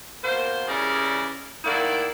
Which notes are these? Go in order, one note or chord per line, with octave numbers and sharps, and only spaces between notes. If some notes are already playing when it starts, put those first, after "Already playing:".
B2 A#3 A#4 C5
C#3 E3 G3 G#4 A#4 D5
D#3 A3 A#3 E4 D5 F#5